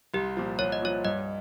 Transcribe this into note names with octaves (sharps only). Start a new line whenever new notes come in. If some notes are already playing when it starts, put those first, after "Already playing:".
C2 G4
A#2 F3
C2 C#5
D#5
A#2 F3 C#5
G2 D#5